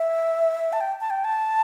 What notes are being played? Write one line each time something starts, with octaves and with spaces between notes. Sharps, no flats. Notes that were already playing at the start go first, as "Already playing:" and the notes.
Already playing: E5
A5
G5
A5
G5
A5